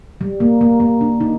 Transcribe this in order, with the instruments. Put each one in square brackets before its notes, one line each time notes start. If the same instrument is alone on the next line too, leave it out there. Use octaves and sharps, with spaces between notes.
[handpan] G3
A#3
A#3
A#3
D4
D#4